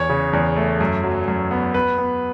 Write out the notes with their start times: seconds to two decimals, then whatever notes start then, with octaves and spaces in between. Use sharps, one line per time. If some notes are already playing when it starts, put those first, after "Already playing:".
Already playing: E2 C#5
0.09 C#3
0.33 E2
0.56 A3
0.81 F#2
1.03 F#3
1.28 F#2
1.51 B3
1.74 B3 B4
1.98 B3